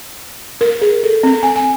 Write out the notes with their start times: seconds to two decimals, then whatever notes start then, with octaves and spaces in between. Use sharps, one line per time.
0.61 A#4
0.81 G#4
1.03 A4
1.23 C4
1.43 G#5
1.56 G#5